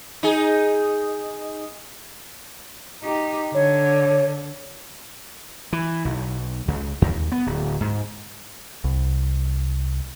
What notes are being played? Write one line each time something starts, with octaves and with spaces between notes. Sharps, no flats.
D#4 G#4
D#4 G4
D3 C#5
E3
B1
C#2
D#2
B3
D1
G#2
C2